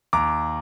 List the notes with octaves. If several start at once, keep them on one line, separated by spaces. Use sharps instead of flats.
D#2 A#5 D6